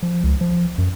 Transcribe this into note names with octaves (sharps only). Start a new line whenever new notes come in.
F3
C#2
F3
F#2